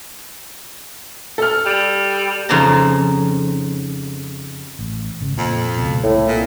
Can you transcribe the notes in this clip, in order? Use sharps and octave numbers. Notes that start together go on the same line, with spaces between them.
A4 F6
G3
F2 C#3 F3 D#4 A5 A#5
A1
G#1 C#3
F2 A#2
C#2 B2
C2 A2 C4
A#2